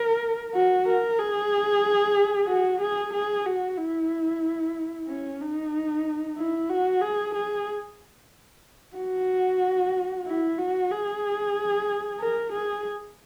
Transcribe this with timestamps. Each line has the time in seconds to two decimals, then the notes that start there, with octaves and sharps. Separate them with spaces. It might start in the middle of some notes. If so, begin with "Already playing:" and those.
Already playing: A#4
0.54 F#4
0.86 A#4
1.19 G#4
2.48 F#4
2.81 G#4
3.13 G#4
3.46 F#4
3.77 E4
5.07 C#4
5.40 D#4
6.37 E4
6.69 F#4
7.01 G#4
7.35 G#4
8.97 F#4
10.26 E4
10.58 F#4
10.91 G#4
12.20 A#4
12.52 G#4